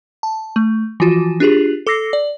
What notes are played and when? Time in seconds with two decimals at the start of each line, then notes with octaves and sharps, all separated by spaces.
0.23 A5
0.56 A3
1.00 E3 F3 F4 F#4
1.40 D4 F4 G4 G#4
1.87 A4 D6 E6 A#6 C7
2.13 D5